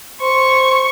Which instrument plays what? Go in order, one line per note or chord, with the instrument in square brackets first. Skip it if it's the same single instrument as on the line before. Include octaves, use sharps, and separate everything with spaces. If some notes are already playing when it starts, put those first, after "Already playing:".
[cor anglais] C5 [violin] C#6